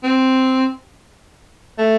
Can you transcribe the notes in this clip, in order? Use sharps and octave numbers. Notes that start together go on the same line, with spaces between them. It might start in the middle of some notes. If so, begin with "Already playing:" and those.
C4
A3